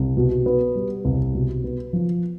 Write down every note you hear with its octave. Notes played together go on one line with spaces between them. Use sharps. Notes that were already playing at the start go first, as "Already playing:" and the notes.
Already playing: C2
B2
B3
G3
C2
B2
B3
F3